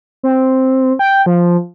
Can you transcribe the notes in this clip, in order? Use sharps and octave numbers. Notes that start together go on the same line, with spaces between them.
C4
G5
F3